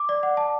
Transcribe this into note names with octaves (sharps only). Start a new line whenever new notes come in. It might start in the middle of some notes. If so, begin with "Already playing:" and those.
Already playing: D6
D5
F#5
A5